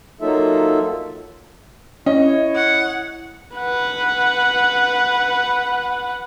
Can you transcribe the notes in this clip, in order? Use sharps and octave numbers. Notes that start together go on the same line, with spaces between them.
F#3 A#3 D#4 F4 A4 E5
C#4 E4 C#5 D#5
F#5
B4 F#5